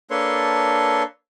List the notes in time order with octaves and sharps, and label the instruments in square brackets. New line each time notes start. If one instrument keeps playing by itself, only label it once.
[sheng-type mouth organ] A#3 D4 A4 B4 C#5 C6